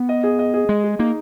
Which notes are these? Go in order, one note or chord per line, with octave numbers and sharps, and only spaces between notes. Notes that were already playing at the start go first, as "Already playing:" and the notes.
Already playing: B3
D#5
G#4
D#5
G#4
G#3 D#5
G#4
A#3 D#4